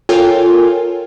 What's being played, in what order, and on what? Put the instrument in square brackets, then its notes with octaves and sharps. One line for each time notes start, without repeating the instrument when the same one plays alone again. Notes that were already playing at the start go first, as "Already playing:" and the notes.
[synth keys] F4 A4 A#4 C#5 G5 G#5